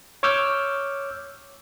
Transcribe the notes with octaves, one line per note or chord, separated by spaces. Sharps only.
C#5 C#6 D6 E6 F6 G6